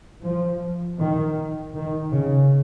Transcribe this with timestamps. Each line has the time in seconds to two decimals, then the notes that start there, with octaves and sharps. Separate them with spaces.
0.23 F3
0.99 D#3
1.75 D#3
2.12 C#3